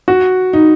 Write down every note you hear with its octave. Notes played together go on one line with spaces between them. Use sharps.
F#4
D#4